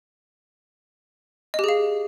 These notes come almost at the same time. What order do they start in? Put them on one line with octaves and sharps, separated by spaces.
D#5 G4 G#4 F5